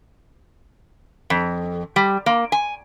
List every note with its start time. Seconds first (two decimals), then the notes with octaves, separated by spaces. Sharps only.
1.30 F2
1.96 G3
2.26 A#3
2.52 G#5